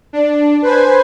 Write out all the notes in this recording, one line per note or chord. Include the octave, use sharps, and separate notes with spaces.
D4
B4 C5 G#5